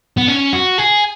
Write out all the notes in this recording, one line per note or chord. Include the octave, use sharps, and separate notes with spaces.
B3
C#4
F#4
G#4